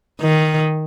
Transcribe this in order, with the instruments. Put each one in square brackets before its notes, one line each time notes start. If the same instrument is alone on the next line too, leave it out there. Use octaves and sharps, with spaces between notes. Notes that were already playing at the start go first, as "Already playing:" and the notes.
[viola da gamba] D#3